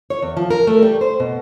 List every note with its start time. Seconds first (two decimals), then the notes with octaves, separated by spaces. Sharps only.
0.10 C#5
0.22 E2
0.37 F3
0.50 A#4
0.67 A3
0.82 G3
1.01 C5
1.20 B2